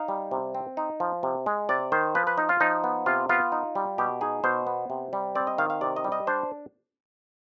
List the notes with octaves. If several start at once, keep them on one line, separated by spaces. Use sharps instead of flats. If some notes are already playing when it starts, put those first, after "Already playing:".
Already playing: D#4 F5
G3
C3
C4
D#4
F3
C3
G#3
C3 D5
D#3 C5
F3 B4
B4
D#4
F4
F3 D#4
B3
C3 F4
B3 F4
D#4
G3
B2 G4
D#4 G#4
B2 C5
B3
C3
G3
C4 D5
D#5
D#3 F5
F5
C3 D5
D#5
G3
D#5
D4 C5